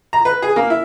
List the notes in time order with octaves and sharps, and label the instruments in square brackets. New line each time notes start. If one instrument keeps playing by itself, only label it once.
[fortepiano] A#5
B4
G#4
A#3
E4